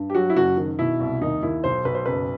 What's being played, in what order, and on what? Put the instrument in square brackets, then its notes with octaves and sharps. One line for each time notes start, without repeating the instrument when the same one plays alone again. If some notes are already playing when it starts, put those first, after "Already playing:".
Already playing: [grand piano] G2
G4
F#3 F#4
E4
F#1 F#4
D#3
B2 E4
C2
D#2 D#4
D#2 E4
B1 C5
B1 B4
C5
F#1 B4